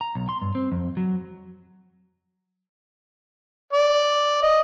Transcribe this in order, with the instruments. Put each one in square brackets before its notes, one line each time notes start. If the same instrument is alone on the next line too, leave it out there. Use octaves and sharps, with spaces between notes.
[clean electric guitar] A#5
B1
C6
G2
C4
F2
F#3
[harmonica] D5
D#5